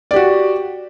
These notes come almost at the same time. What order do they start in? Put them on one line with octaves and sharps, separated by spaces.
D5 G4 F#4